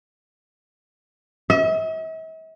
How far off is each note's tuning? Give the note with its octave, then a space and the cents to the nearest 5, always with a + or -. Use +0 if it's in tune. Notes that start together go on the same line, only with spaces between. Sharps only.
E5 -45